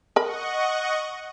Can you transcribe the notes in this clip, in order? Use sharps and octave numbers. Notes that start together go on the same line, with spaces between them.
A#4 D#5 F#5 B5 C#6